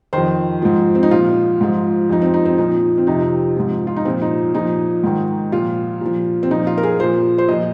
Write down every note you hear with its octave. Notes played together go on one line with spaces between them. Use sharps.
F2 D#3 C5
G#2 F3
C4
D#4
A#2 F3 F4
G#2 F3
F2 F3 D#4
C4
D#4
C4
A#2 F3 D#4
C4
F2 C3 F3 D#4
G#2 F3
F4
D#4
A#2 F3 C4
D#4
A#2 F3 D#4
G#2 D#3
A#2 F3 F4
A#2 F3
C4
A#2 F3 D#4
F4
A#4
G#4
A#2 F3 C5
C5
A#2 F3 D#5